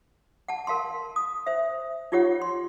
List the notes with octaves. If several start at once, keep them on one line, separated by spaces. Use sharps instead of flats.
F#5 A5
A#4 F5 A5 C6
D#6
C5 E5
D#4 F4 G4 C#5 F#5
C6